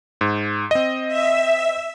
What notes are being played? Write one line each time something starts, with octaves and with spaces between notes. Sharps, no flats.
G#2
C4 D#5
E5